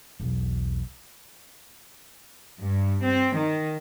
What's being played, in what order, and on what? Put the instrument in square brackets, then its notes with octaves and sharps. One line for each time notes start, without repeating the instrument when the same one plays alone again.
[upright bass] B1 E2
[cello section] G2
C4
D#3